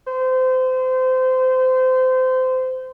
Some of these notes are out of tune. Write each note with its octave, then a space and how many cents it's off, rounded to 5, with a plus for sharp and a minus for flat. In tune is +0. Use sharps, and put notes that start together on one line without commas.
C5 -25